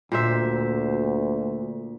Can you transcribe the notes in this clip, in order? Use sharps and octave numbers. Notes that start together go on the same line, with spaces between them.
D2 A#2 C5 E5